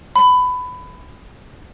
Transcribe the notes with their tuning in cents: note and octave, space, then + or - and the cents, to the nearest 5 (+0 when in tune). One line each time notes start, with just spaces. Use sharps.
B5 +20